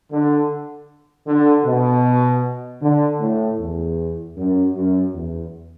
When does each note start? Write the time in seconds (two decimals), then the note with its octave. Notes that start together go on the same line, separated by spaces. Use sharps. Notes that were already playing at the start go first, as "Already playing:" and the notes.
0.11 D3
1.27 D3
1.65 B2
2.81 D3
3.20 A2
3.59 E2
4.36 F#2
4.74 F#2
5.14 E2